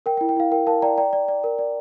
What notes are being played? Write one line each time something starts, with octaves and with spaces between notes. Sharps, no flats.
A#4 G5
G5
E4
G5
E4 F5
A#4 G5
A#4 F5 A5
D5 G5 A#5
D5 G5 A#5
D5
D5
A#4
D5